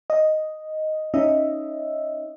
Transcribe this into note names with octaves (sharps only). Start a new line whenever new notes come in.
D#5
C#4 D#4 D#5 E5